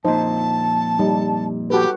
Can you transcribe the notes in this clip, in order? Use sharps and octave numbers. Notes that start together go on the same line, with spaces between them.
F2 A#2 D#4 C5 A5
G3 D#4
F#4 G4 A4 B4